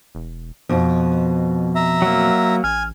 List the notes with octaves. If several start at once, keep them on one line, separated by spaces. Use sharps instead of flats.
E1
F2 B2 F3
E5 A#5
F#3 A#3
A1 G#5 F6